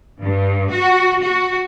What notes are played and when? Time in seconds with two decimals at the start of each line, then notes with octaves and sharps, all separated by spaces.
0.21 G2
0.69 F#4
1.21 F#4